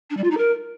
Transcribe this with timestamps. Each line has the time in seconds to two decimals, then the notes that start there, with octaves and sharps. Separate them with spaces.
0.10 D4
0.17 G3
0.24 F4
0.31 D#4
0.37 A#4